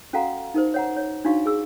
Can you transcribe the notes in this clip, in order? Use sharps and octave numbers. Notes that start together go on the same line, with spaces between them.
C#4 F#4 A4 F5 F#5 A#5
D#4 A#4 C5
C#5 F#5 A#5
C#5
D4 D#4 F#4 F5 C#6
G#4 E6